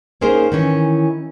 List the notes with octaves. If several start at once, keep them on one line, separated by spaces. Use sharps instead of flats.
A#3 C#4 D#4 G#4 A#4 C5
D#3 E3 C#4